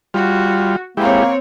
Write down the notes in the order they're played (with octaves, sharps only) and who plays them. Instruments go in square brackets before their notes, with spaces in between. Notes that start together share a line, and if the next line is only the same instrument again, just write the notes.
[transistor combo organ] G3 F4 [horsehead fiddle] F#4
[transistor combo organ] G#3 E4 G4 [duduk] A#3 [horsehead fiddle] C4 C#5